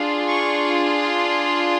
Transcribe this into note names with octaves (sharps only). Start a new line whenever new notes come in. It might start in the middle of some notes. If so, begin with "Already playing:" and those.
Already playing: D4 F4 G#4
C#6